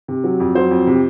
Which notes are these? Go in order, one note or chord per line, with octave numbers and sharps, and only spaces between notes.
C3
F#3
F2
F#3 C5
F2
C3